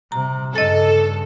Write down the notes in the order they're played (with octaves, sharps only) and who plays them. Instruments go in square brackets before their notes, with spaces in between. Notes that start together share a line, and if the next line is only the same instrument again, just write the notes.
[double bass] C3 G3 [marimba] A#5
[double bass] G2 C#3 [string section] A4 [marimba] D#5 A6